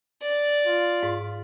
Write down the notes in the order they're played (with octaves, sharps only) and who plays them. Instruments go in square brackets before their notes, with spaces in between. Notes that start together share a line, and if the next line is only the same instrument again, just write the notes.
[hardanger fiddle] D5
[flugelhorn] F4
[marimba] G#2